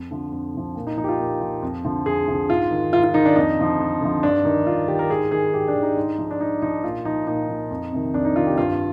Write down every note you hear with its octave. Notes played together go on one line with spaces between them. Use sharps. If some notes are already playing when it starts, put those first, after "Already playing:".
Already playing: F2
D3 F3
F2
D3 F3
A#2
D#4
F3 D#4
G4
F4
A#2
F3
F2
D3 F3
F2 G#4
D3 F3
G#2 F4
D#3
G#2 F4
F4
D#3 D#4
D4
F2 D#4
D3 F3
F2
D3 F3
G2 D4
D#3 D#4
G2 F4
D#3 G4
A#4
G#2 G#4
D#3 G#4
G#2 G4
D4
D#3
D#4
G#2
F3
D4
G#2 D#4
F3 D#4
A#2 F4
F3 D#4
A#2 D#4
F3
F2
C3 D#3
F2 D4
D#4
C3 D#3 F4
G4
G2 F4